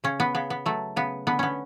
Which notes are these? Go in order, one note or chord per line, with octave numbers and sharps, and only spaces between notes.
C#3 C#4
B3
C#3 B3
B3
F#3 A3
C#3 B3
D3 B3
B3 C#4